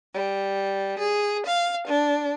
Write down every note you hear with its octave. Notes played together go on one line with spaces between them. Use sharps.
G3
G#4
F5
D4